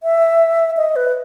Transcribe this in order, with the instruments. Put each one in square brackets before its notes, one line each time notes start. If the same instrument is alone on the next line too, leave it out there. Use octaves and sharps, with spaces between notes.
[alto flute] E5
D#5
B4